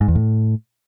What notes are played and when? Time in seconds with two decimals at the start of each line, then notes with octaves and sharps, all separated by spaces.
0.01 G#2
0.08 E2
0.15 A2